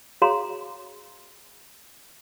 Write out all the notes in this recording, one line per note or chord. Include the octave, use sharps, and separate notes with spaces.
F#4 G#4 C#5 F5 A#5 C6